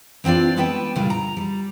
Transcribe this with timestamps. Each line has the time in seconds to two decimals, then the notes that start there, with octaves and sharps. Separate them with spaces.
0.24 E3 C4 D4 F4 D5
0.56 G#3 B3 D4 B4 G5 A5
0.96 A#2 C#3 G3 F4
1.10 A#5
1.37 G3